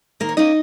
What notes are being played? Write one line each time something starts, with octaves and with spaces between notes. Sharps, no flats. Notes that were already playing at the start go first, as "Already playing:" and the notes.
D#3 A#3 A#4
C#5
A#3 C#4 D#4 D#5